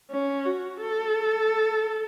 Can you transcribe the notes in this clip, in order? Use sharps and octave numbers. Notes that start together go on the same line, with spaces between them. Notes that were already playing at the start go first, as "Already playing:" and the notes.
C#4
F#4
A4